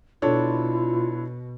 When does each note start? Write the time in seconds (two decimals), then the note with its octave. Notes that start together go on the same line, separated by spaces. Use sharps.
0.22 B2 D4 E4 F4 A4 C#5